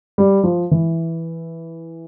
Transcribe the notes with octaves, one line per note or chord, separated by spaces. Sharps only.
G3
F3
E3